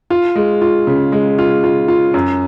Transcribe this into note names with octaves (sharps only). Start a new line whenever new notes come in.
F4
G#3
F4
C#3
G#3
F4
F4
F4
F#2